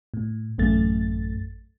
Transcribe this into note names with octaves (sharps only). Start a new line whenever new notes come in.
A2
A1 F#2 A3 A6